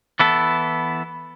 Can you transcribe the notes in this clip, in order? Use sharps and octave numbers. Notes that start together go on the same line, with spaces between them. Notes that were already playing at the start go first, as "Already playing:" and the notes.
E3 B3 E4 A4